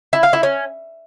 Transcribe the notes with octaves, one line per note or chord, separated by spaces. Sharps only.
E4
F5
E4
C#4